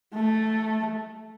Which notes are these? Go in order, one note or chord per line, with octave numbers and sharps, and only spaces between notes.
A3